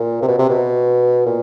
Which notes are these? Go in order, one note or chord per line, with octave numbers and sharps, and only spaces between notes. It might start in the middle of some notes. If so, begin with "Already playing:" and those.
Already playing: A#2
C3
B2
C3
B2
A#2